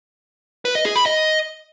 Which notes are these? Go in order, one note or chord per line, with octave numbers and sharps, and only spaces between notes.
B4
D#5
G#4
B5
D#5